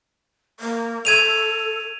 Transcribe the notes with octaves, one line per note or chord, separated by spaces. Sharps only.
A#3
A4 G#6 D#7 F7